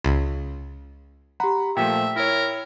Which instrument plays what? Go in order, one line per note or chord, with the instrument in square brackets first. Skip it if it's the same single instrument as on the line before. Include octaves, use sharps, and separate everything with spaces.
[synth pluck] C#2
[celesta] G4 A#5 [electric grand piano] F#5 B5
[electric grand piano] A#2 F3 A3 [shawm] E5 [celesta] G5
[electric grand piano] E4 C#5 [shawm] A#4